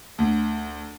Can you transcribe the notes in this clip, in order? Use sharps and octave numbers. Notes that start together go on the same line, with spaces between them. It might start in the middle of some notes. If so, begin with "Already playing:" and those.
D2